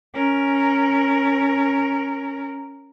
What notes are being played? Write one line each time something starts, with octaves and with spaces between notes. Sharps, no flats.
C#4 A#4